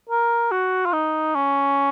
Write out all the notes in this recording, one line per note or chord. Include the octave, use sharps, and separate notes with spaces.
A#4
F#4
F4
D#4
C#4